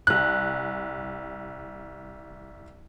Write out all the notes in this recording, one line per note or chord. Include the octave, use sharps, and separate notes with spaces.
C2 F#6